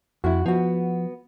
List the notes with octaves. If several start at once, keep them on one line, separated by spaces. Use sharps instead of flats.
F2 E4 F#4
F3 B3 F#4